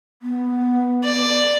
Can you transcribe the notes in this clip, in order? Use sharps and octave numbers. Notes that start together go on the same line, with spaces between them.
B3
D5